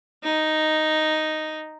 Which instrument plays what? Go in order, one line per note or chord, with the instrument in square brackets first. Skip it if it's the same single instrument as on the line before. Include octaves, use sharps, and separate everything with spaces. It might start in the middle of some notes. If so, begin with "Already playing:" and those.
[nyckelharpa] D#4